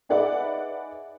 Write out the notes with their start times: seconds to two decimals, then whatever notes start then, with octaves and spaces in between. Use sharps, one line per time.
0.09 D#4 G#4 B4 D5 E5 F#5